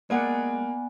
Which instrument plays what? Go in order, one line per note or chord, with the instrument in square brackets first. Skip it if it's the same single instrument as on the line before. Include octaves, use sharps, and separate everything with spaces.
[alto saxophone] G#3 [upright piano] A#3 [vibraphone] B3 G#5 [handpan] D5 F#5